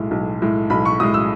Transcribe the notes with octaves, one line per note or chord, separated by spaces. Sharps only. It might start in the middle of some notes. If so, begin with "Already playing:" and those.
Already playing: B1 A2 G#3
B1
A2 G#3
B1 B5
C#6
A2 G#3 D#6
E6